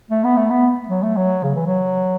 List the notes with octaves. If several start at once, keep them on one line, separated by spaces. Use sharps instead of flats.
A3
B3
A3
B3
F#3
A3
F#3
C#3
E3
F#3